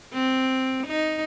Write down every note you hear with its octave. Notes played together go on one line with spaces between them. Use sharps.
C4
D#4